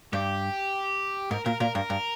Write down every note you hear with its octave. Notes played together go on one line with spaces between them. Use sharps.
G2 G4
G#2 A#4
A#2 A#4
A#2 A#4
G2 A#4
G2